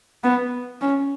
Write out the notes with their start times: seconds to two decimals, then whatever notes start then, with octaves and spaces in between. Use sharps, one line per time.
0.24 B3
0.81 C#4